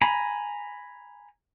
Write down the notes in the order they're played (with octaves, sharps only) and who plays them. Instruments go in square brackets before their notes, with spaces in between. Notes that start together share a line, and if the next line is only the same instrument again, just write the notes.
[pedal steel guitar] G#5 A#5 B5